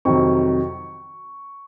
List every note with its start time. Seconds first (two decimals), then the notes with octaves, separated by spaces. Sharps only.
0.05 F2 C3 D#3 F#3 C#6